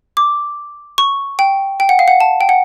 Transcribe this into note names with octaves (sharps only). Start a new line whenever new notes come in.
D6
C#6
G5
G5
F#5
F5
F#5
A5
G5
F#5